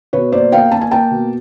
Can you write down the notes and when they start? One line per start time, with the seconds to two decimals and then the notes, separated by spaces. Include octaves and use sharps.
0.13 B2 B4 C#5
0.32 A#3 C5 D5
0.52 A#3 F5 G5
0.71 A#3 A5
0.81 G#5
0.91 A#3 G5 A5
1.11 B2